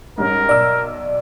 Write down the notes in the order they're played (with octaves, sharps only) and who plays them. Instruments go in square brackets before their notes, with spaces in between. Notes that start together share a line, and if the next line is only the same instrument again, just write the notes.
[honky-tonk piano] G#2 G3 C#4 [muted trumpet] A#4
[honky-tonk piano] B1 E6 [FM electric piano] D5